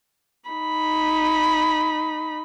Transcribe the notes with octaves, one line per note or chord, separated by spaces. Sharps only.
D#4 B5